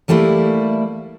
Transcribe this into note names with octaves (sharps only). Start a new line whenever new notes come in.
E3 G3 A3 A#3 E4